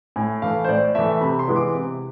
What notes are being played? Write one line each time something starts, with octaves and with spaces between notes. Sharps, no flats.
A2 G#5
E3 A3 F5
C5
A2 D5
E3 A3 E5
C3 B5
C6
E3 G#3 B3 E4
D6
C3